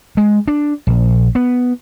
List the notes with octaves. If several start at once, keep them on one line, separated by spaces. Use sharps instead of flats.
G#3
D4
A#1
B3